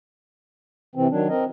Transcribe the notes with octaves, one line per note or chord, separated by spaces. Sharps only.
C3 E3 C4
D#3 F#3 D4
C4 A#4 D#5